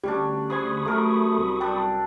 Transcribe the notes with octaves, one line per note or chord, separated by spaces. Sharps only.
D2 G3 C#4 D4 G4
G#4 C5 G#5 B5 C#6 D#6
F#3 A3 A#4 D6
C2
D4 A4 G5